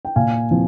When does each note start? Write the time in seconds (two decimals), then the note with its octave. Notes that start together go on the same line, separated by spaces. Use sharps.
0.05 G5
0.16 A#2 F5 G#5
0.51 F3 C4